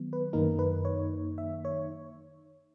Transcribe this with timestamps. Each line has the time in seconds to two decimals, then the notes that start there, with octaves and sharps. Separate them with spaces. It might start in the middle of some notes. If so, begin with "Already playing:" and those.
Already playing: D#3 F#3 B3
0.13 B4
0.33 F#2 D#3 A#3 D#4 A#4
0.59 B4
0.85 C#5
1.38 E5
1.65 C#5